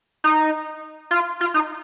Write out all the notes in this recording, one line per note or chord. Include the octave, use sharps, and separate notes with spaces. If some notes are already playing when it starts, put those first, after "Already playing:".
D#4
F4
F4
D#4